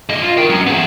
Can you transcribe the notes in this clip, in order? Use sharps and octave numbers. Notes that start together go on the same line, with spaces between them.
G3 D#5
F4
A#4 G5
F#3 C#4
B3 G#4